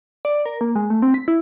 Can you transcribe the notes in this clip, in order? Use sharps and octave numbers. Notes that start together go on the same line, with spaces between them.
D5
A#4
A#3
G#3
A3
C4
B6
E4